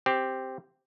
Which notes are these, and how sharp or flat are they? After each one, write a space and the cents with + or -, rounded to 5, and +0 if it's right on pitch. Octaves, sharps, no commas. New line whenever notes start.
C4 +0 G4 +0